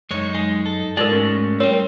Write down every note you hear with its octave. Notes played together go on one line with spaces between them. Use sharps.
F#2 G#3 D#4 C#5
G#3
A4
G#2 G#3 D#4 A4 A#4 D5
A3 C#4 F#4
G3 C4 A#4 C#5